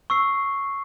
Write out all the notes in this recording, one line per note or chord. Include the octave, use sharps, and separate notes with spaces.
C#6 E6 C7